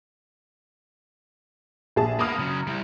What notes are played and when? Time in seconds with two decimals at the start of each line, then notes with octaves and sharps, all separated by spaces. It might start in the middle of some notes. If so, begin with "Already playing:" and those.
1.96 A#1 G#4 A5
2.19 A#3 B3 B5 D#6 F6
2.39 C#3 F#3
2.67 G3 E4